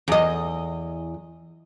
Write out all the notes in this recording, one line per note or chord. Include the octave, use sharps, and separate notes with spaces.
E2 D#5